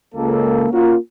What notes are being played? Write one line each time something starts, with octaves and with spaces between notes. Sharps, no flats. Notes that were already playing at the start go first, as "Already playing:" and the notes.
C#2 A#3 A4
A#3 C#4 F4 F#4 A#4